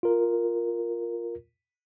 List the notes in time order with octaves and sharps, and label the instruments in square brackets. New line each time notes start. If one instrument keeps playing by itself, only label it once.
[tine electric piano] F4 A#4